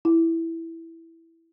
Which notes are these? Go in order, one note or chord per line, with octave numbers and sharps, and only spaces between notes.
E4